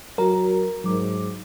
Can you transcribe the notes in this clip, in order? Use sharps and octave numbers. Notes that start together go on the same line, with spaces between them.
F#3 F#4 A#4 A#5
G#2 F#3 D6